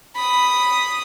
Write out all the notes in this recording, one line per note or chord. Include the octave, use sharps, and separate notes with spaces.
B5 D#6